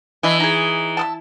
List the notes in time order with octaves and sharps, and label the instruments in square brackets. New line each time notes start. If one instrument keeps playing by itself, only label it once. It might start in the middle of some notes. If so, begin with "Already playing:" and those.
[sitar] E3 [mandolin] D4 E4 D#5
[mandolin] D#4 G#4
A5 D#6 E6